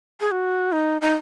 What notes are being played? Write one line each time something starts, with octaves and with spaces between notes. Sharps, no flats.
G#4
F#4
D#4
D#4